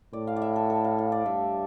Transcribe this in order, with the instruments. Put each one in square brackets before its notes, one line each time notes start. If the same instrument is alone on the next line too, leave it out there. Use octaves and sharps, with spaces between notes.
[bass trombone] A2 [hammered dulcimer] D5
[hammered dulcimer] F5
D5
E5
A4
A4
F5
F5
D5
[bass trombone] G2 [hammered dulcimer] E5